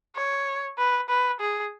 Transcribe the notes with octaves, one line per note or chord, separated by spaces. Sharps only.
C#5
B4
B4
G#4